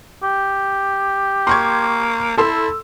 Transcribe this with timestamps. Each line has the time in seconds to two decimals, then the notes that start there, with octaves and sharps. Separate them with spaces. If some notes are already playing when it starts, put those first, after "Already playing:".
0.23 G4
1.47 A#3 C6 C#6 G#6
2.37 E4 A4 C6 E6